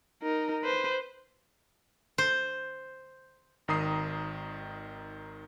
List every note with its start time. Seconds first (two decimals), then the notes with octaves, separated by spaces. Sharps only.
0.22 D#4 A#4
0.63 B4 C5
2.18 C5
3.68 G#1 D#3 A#5 D#6 C7